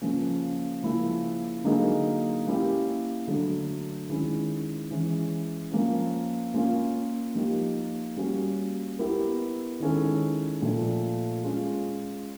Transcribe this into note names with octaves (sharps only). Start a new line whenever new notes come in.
C#3 F3 A#3 C#4
C#3 F3 A#3 C#4 E4
D3 F#3 A#3 D#4 G#4
A#3 C#4 E4 G4
D3 F#3 A3
D#3 G#3 C#4 E4
E3 G#3 C#4
F3 A#3 C#4
A#3 C#4 F4
F3 A#3 D#4 G4
G3 A#3 C#4 F#4
B3 E4 G4 A#4
D#3 G#3 C#4 E4 A4
A#2 F3 A3
G#3 C#4 F4